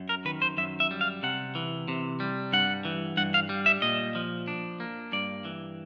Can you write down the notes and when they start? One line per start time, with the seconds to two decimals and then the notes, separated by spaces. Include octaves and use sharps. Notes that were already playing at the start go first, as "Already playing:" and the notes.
Already playing: F#2
0.09 A#4
0.25 D#3 B4
0.42 C5
0.57 F#2 E5
0.80 E5
0.91 G3
1.01 F5
1.23 C3 F#5
1.55 E3
1.88 C3
2.20 G3
2.53 G2 F#5
2.85 E3
3.17 G2 F#5
3.34 F5
3.49 G3
3.66 E5
3.82 A#2 D#5
4.15 F3
4.48 D4
4.80 A#3
5.12 G2 D5
5.45 E3